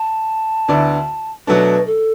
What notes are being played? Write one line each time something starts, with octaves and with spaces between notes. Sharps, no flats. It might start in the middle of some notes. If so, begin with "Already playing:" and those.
Already playing: A5
D2 D3 B3 E4 D5
B2 F#3 A3 D4 B4
A4